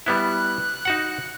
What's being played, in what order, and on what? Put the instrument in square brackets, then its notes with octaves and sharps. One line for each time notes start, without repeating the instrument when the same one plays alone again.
[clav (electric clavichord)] G3 B3 E4 [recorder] F#6
[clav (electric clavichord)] D#4 F#4 F#5